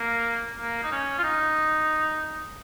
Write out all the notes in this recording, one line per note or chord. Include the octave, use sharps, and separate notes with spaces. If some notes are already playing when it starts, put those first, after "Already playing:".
Already playing: A#3
A#3
D#4
C#4
F4
D#4